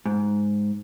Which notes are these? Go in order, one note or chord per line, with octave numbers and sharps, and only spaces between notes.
G#2